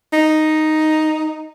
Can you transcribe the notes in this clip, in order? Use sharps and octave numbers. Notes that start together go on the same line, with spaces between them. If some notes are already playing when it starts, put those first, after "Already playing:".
D#4